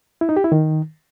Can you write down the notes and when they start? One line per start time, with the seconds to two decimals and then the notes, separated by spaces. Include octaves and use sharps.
0.21 E4
0.29 D#4
0.37 G4
0.44 E4
0.52 D#3